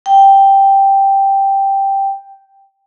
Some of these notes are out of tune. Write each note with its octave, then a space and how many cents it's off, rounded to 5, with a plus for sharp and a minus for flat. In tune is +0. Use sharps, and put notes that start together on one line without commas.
G5 +0